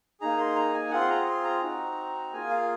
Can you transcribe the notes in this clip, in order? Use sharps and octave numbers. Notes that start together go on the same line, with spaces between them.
A#3 D#4 G#4 A#5
C6
A#5
G#5
C4 F4 G#4 F#5
C6
A#5
C6
A#5
C4 D#4 F#4
A#3 F4 G#4 G#5
F5